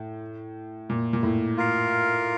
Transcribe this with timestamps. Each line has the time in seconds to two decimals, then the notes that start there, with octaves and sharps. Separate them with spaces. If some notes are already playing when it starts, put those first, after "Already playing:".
Already playing: A2
0.90 A#2
1.13 A#2
1.23 A2
1.57 F4 A#4 F5